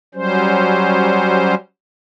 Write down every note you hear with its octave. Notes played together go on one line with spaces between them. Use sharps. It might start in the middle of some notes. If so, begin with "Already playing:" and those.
F#3 G3 C#4 C5